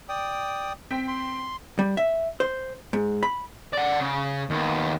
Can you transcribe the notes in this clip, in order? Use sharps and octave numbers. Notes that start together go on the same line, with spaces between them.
D5 G5 D#6
C4 G5 B6
C6
G3
E5
C5
G#2
B5
D5 F#5
C#3
D#2 B3